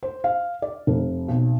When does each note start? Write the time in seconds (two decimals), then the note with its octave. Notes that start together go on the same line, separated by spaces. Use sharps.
0.03 C5
0.24 F5
0.62 D5
0.87 F1
1.28 B1